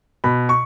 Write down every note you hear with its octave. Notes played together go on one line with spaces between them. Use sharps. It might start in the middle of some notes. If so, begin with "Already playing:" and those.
B2 B5
C#6